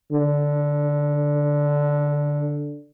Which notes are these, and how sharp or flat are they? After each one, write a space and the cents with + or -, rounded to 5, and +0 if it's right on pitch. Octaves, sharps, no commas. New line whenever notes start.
D3 -5